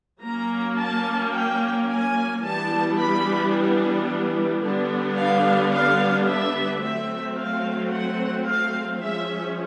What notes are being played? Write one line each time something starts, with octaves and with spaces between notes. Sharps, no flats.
F#3 A#3 C#4 A#5
A5
G5
G#5
E3 G3 B3 D4 A5
B5
D3 G3 B3 D4
F5
F5
E5
F#3 A3 C4 E5
F5
F#5
F5
F3 G#3 C#4 E5